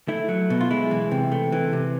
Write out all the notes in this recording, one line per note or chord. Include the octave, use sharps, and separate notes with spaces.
A3 E4
F#3
B2
F4
G#3 E4
E3
C3
A3
E3
C3